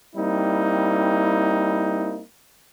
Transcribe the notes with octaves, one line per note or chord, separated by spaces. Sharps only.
G3 A#3 C4 D#4 E4